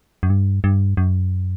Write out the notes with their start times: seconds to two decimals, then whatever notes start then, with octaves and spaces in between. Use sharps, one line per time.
0.23 F#2
0.30 G2
0.64 G2
0.97 F#2